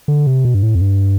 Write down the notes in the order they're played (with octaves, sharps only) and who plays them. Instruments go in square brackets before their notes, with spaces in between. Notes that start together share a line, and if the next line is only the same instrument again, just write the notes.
[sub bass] D3
C3
B2
G2
A2
F2
G2